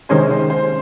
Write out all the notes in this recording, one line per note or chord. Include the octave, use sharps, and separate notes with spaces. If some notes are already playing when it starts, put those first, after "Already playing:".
C3 D#3 G#3 C#4 C5
C5
C5